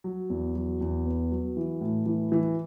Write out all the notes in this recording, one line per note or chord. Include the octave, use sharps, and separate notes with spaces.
F#3
E2
F#3
E2
B3
F#3
E3
A2
E3
E3